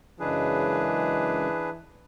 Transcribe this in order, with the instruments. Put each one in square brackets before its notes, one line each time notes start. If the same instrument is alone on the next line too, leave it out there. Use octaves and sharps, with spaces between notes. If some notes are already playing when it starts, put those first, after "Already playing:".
[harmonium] F#2 C#3 G#3 [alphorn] E3 [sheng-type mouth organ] D4 G#4 B4